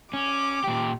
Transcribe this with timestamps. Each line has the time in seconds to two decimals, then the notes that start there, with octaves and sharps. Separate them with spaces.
0.13 C#4 D6
0.64 A#2 G4